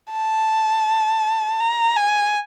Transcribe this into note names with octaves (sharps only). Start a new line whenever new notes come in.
A5
A#5
G#5